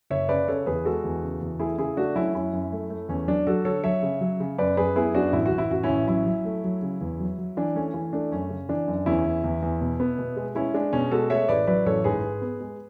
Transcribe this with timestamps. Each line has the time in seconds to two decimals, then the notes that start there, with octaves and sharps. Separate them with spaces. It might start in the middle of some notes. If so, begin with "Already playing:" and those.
0.10 F#1 C#5 E5
0.29 C#3 B4 D5
0.48 C#3 A4 C#5
0.66 E2 G#4 B4
0.85 G#3 F#4 A4
1.04 E2
1.23 C#3
1.41 E2
1.59 A3 E4 G#4
1.78 C#3 E4 G#4
1.97 A3 D4 F#4
2.16 F#3 C#4 E4
2.35 F#2 C#4 E4
2.53 F#2
2.72 A3
2.90 A3
3.09 E2 C#4
3.27 F#3 D4
3.47 F#3 F#4 A4
3.65 D3 A4 C#5
3.84 F#3 C#5 E5
4.02 C#3
4.21 F#3
4.40 C#3
4.58 F#2 B4 D5
4.77 F#2 G#4 B4
4.96 B3 E4 G#4
5.15 F#2 D4 F#4
5.33 A1 E4
5.46 F#4
5.52 A1
5.58 E4
5.71 A1 F#4
5.83 C#4 E4
5.89 A1
6.07 F#3 C#4 E4
6.26 F#3
6.45 A3
6.64 F#3
6.82 C#3
7.01 E2
7.20 F#3
7.38 F#3
7.57 E3 D4
7.75 A3 C#4
7.94 E3
8.13 A3 D4
8.32 F#2 C#4
8.50 C#3
8.69 E3 D4
8.88 F#2
9.06 E2 C#4 E4
9.25 E2
9.44 E2
9.62 E2
9.81 B2
10.00 B3
10.19 B2
10.37 G#3
10.55 G#3 C#4 E4
10.74 G#3 D4
10.93 B2 C#4
11.12 G#3 F#4 A4
11.30 A3 C#5 E5
11.49 A1 B4 D5
11.67 F#3 B4 D5
11.86 A1 A4 C#5
12.04 G#2 G#4 B4
12.24 G#2
12.42 B3
12.61 G#3